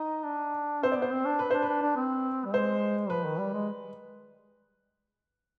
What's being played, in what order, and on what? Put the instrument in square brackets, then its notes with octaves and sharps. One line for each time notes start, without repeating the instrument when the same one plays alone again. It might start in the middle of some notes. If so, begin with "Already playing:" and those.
Already playing: [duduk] D#4 [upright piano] D#5
[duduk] D4
[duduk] C4 [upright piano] C5
[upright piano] D5
[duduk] B3
[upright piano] C5
[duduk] C4
D4
[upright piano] B4
[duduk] D4 [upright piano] C5
[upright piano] B4
[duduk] D4
D4
C4
G3
[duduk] G#3 [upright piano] C5
[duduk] F3 [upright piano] B4
[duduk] D#3
G3
G#3